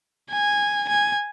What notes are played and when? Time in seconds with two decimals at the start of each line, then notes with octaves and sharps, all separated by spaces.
0.31 G#5
0.89 G#5